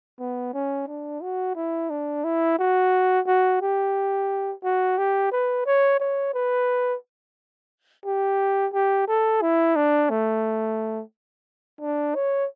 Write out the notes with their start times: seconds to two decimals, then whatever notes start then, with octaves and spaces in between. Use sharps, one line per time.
0.20 B3
0.54 C#4
0.88 D4
1.22 F#4
1.56 E4
1.90 D4
2.24 E4
2.59 F#4
3.27 F#4
3.61 G4
4.64 F#4
4.98 G4
5.32 B4
5.66 C#5
6.00 C#5
6.34 B4
8.06 G4
8.74 G4
9.08 A4
9.42 E4
9.76 D4
10.10 A3
11.81 D4
12.15 C#5